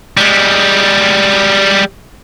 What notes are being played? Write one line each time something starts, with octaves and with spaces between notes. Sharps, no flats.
G3 G#3